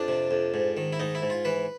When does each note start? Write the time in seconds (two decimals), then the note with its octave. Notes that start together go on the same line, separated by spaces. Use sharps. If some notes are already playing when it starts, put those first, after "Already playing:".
Already playing: F2 D4
0.08 C3
0.31 F2
0.54 G#2
0.77 D#3
0.93 E4
1.00 G#2 D#4
1.15 E4
1.22 G#2
1.30 F4
1.45 E3 B4